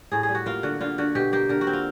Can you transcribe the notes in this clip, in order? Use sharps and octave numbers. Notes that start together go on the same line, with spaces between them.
A2 G#4
G#4
G3
F#4
A#3 F4
D3 F#4
D3 F4
D3 F#4
B2 G4
A#3 G4
D3 A#4
F#4
C4
F4